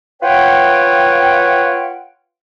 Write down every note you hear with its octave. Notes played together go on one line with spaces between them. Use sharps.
F4 B4 C#5 F#5 G5